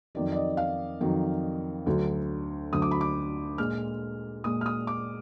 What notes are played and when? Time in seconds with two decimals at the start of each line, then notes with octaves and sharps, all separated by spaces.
0.15 F2 D#3 F#3 D5
0.32 D5
0.36 D#5
0.57 F5
1.01 F2 D#3 F#3
1.86 D2 D3 F#3
2.72 D2 D3 F#3 D#6
2.82 D6
2.91 B5
3.01 D6
3.58 A#2 G#3 F6
4.44 A#2 G#3 D#6
4.61 F6
4.66 D#6
4.87 D6